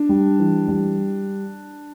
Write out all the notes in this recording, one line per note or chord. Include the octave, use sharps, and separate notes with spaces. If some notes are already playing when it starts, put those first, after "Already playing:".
Already playing: D4
G3
E3
G3